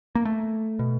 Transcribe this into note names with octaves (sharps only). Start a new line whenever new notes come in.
A#3
A3
B2